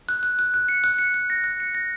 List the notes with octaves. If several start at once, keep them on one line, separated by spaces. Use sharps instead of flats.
F#6
F#6
F#6
F#6
C#7
F#6
C#7
F#6
A#6
F#6
C#7
A#6